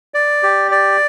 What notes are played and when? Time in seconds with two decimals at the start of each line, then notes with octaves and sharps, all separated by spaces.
0.14 D5
0.43 G4
0.71 D5